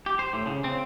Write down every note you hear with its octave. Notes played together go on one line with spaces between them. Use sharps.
G4
C5
A2
C#3
C4